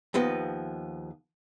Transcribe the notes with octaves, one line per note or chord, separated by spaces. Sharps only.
D#2 F3 B3 D#5